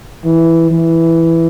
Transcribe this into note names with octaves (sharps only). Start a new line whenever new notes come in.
E3
E3